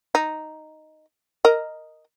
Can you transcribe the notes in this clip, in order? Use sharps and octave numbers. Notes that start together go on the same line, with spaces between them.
D#4
A#4 D#5